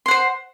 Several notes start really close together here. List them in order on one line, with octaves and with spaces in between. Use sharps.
C6 F#5 C5